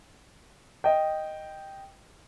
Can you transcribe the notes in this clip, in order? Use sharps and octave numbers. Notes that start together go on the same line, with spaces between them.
D#5 G5